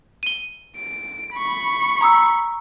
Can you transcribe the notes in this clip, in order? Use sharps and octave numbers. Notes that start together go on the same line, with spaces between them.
D#7 G7
D7
B5 C#6
A#5 D#6 E6